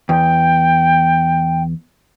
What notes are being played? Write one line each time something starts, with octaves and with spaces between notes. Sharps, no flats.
E2 G5